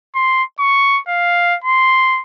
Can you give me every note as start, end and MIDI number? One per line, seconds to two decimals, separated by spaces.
0.15 0.43 84
0.60 1.00 85
1.08 1.56 77
1.64 2.21 84